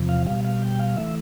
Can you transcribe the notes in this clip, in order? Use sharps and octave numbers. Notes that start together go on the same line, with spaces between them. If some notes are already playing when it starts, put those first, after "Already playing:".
Already playing: E2 C3 F3
F5
B2 G3 F5
F5
G5
F5
E3 A3 E5